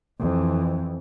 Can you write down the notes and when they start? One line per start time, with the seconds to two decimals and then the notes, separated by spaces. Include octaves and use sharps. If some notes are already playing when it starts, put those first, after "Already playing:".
0.20 F2 E3